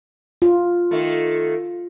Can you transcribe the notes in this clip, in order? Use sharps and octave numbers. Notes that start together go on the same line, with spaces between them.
F4
D#3 A3